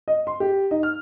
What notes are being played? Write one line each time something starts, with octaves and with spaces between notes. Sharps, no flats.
D#5
C6
G4
D#4
F6